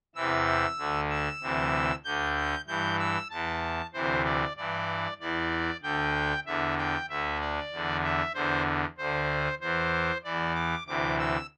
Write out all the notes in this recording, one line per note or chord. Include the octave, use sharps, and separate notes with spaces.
E2 C3 E3 E6
D2 D3
E6
D2 C3 E3
D2 D3 G6
G2 E3 G6
E6
E2 E3 A5
D2 C3 E3 C5
D5
G2 E3 D5
E2 E3 D5
D2 D3 G5
E2 D3 E5
G5
D2 D3 E5
D5
E2 D3
E5
E2 D3 C5
D2 D3 C5
E2 E3 C5
E2 E3 D5
D6
D2 C3 E3 D6
E6